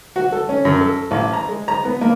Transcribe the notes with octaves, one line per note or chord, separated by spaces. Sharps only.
F#4
A4
C#4
F#2
A4
A1
A#5
G#3
A#5
B3
A#3